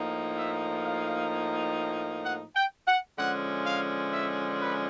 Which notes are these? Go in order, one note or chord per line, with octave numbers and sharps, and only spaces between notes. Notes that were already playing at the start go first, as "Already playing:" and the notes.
Already playing: A2 F3 A#3 D#4
E5
F5
F#5
G5
F#5
D3 F3 G#3 C#4 F#5
F5
E5
B4